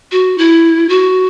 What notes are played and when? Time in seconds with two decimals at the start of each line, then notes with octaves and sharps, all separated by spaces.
0.11 F#4
0.38 E4
0.89 F#4